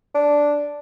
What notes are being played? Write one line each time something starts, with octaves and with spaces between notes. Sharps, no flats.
D4